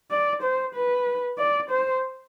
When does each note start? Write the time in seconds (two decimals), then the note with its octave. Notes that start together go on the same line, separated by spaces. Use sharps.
0.11 D5
0.42 C5
0.75 B4
1.38 D5
1.70 C5